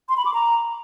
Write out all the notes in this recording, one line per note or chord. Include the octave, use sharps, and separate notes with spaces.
C6
B5
D6
A#5